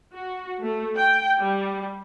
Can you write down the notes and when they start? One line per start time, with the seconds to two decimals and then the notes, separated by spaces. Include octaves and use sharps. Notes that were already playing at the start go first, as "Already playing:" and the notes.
0.14 F#4
0.60 A3
0.96 G5
1.39 G3